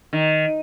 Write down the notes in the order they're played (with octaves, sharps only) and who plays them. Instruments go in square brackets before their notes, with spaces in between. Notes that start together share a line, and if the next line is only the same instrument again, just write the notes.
[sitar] D#3